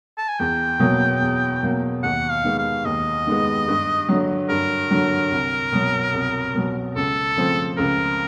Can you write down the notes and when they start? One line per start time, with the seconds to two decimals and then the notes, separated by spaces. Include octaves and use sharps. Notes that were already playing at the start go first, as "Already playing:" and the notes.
0.18 A5
0.28 G#5
0.39 E2 G5
0.79 B2 F#3 A#3
1.21 E2
1.63 B2 F#3 A#3
2.03 D#2 F#5
2.31 F5
2.44 D#3 G#3 B3
2.58 F5
2.85 D#2 D#5
3.27 D#3 G#3 B3
3.68 G2
4.09 D3 F#3
4.49 G2 A#4
4.91 D3 F#3
5.31 C2
5.72 B2 F#3
6.14 C2
6.55 B2 F#3
6.96 C#2 A4
7.36 C#3 F3 A3 C4
7.78 C#2 A#4